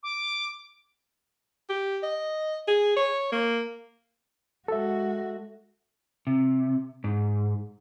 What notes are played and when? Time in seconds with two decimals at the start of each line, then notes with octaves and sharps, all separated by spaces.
0.03 D6
1.69 G4
2.03 D#5
2.68 G#4
2.97 C#5
3.32 A#3
4.68 G#3 F#4 A4 E5
6.27 C3
7.04 G#2